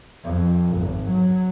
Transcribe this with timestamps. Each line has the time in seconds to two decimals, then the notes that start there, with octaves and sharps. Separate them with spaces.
0.24 F2
0.77 G#1
1.09 F#3